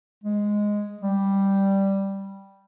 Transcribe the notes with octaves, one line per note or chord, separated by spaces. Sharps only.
G#3
G3